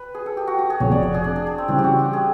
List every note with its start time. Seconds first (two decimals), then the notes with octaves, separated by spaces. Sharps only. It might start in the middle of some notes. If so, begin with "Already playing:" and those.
Already playing: B4
0.15 G#4
0.26 A4
0.37 G4
0.47 F#4
0.59 F#4
0.70 G#4
0.80 F1 F2 C3 C#5
0.91 D5
1.03 D5
1.14 G#4
1.24 D4
1.36 D4
1.47 D4
1.58 C4
1.68 C#3 E3 G3 C4
1.78 G4
1.84 F#4
1.99 G4
2.13 G#4